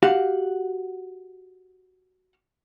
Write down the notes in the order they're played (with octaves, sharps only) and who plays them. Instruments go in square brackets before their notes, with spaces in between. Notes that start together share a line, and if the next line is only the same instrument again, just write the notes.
[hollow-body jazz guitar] F#4 G4 F5 F#5